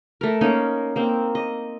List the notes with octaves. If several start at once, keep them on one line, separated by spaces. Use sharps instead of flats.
A3 A#4
A#3 C#4 D#4
A#3 C4
D#5